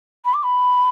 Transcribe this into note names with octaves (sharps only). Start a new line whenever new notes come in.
B5
D6
B5